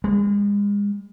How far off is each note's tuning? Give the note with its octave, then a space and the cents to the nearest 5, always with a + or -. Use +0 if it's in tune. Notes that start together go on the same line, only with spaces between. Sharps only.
G#3 -35